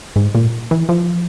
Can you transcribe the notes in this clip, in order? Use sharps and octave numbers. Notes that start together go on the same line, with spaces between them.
G#2
A#2
E3
F3